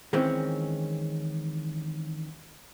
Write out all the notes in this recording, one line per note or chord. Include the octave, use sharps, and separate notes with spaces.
D#3 E3 G#3 C4 C#4